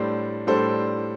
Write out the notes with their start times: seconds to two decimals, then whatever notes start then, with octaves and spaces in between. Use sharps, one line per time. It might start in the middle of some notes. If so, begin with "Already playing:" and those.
Already playing: A2 G3 D4 A4 C5
0.47 A2 G3 D4 A4 C5